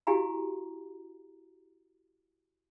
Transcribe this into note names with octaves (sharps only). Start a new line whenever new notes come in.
E4 F#4 G4 F5 G#5 A#5